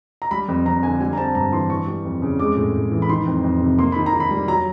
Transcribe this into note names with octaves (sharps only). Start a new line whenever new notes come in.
A#5
G3 B5
F2
F2 A#5
D3 G#5
G3 G#5
A#5
C4 A5
G2 A#5
E3 C6
E3 C#6
G3
F2
C#3
G#3 D6
A2
A2
E3
B5
D#3 C6
F2
F2
C3
A#3 C6
D#3 B5
A#5
D#3
B5
G3
F#3 A#5